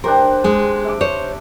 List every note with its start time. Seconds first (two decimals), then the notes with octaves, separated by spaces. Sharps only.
0.04 D4 G4 A#4 C5
0.44 G#3 G#4
0.84 E5 D6
1.01 C5 C#5